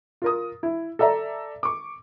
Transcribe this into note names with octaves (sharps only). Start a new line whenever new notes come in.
F4 A#4 D#6
E4
A4 D5 E5 A#5
C#6 D6